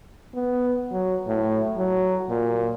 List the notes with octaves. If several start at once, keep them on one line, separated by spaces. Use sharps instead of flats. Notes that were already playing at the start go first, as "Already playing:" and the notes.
B3
F#3
A2
F#3
A#2